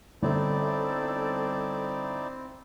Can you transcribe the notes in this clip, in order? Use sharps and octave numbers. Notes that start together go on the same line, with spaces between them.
G1 C4 D#4 E4 A4 D5